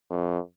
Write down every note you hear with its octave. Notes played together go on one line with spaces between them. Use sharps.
F2